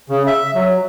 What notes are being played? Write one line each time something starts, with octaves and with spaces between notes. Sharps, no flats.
C#3
E5
F#3